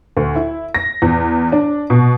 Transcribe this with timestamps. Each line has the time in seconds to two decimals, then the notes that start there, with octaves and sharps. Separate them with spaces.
0.17 D2
0.36 E4
0.74 A#6
1.02 E2
1.52 D4
1.90 B2